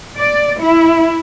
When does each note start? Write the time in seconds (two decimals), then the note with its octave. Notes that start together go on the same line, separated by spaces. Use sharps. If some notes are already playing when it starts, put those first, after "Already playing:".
0.16 D5
0.60 E4